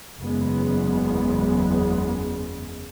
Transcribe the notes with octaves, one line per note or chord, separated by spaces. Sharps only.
F#1 E2 C#3 G#3 B3